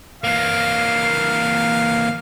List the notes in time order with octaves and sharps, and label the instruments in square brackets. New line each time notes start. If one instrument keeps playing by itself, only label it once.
[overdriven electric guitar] E3 A#3 [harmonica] F5